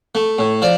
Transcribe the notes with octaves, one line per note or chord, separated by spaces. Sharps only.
A3
A2
F3 D5